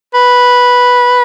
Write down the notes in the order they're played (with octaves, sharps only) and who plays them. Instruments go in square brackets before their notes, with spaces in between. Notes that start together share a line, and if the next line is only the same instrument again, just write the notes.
[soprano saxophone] B4